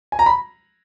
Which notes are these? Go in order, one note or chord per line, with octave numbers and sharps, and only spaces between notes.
G#5
A#5
B5